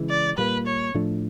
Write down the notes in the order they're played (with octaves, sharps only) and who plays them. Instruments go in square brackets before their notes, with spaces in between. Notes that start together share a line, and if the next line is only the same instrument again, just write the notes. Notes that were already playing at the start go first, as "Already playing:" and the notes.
Already playing: [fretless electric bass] C#3 E3 G#3
[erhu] D5
[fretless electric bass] A#2 G3 A#3 [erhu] B4
[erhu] C#5
[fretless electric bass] A2 F3 A3 D4